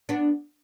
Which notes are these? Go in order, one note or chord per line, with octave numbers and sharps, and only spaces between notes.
B3 D4